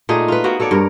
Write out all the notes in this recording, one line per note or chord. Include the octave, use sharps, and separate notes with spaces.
A#2 A3 D#4 G#4
F4 B4
A#3 B3 F#4
F#4 A4 C#5 D5
G2 A#4